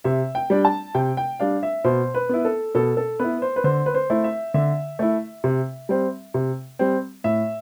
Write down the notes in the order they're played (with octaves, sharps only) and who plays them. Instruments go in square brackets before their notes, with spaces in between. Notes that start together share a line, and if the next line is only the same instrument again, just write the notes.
[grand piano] C3 E5
G5
G3 D4
A5
C3 G5
G5
G3 D4 F5
E5
B2 C5
B4
B3 E4
A4
B2 A4
A4
B3 E4 B4
C5
B4
D3 C5
B4
C5
A3 E4
E5
D3 E5
A3 E4
C3
G3 C4
C3
G3 C4
A2 E5